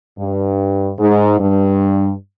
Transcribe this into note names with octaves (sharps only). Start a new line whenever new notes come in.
G2
G#2
G2